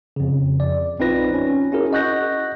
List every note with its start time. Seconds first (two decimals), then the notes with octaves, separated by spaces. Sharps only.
0.16 F2 C#3
0.60 D5
0.99 A#1 C4 D#4 F4 B4 A#6
1.34 C#4
1.72 C#4 E4 F#4 G#4 A#4
1.93 D#5 F#5 C#6 F#6 G6 A#6